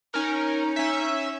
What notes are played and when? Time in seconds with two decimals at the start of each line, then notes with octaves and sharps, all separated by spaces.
0.14 C#4 D#4 A#4
0.76 C#4 E5